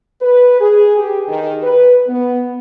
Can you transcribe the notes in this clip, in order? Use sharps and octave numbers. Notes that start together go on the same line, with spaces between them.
B4
G#4
G4
D#3
B4
B3